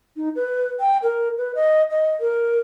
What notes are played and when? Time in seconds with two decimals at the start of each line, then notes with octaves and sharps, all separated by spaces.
0.16 D#4
0.36 B4
0.80 G5
1.03 A#4
1.38 B4
1.55 D#5
1.91 D#5
2.20 A#4